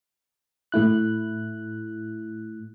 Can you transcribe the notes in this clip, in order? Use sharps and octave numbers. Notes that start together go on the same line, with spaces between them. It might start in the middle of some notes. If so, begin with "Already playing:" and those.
A2 A3 E4 F#6